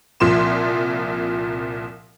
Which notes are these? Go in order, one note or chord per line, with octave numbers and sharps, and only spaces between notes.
C2 A#2 F3 C6 E7